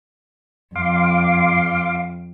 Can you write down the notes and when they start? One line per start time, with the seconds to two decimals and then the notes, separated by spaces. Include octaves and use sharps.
0.75 F2 F5 C6 D6